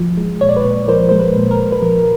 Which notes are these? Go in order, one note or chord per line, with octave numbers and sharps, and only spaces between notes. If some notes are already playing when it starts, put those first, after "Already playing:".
Already playing: F3
G#3
A#2 C#5
D5
B4 C#5
A#2
F3 A#4 C5
G#3 C5
B4
A#2
A#4
A#2
B4
F3 A#4